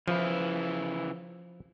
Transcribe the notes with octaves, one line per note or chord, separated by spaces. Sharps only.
C#3 E3 F3 E4